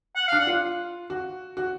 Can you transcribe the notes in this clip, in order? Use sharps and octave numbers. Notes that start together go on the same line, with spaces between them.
F#5
F5
D4
F#5
F4
F#4
F#4